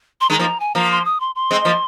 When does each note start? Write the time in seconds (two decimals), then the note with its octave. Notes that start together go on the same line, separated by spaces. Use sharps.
0.21 C6
0.30 D#3 G#3 A#5
0.39 F3 A#3
0.60 G#5
0.75 F3 A#3 A#5
0.91 C6
1.05 D#6
1.20 C6
1.35 C6
1.51 G#3 C4
1.65 F3 A#3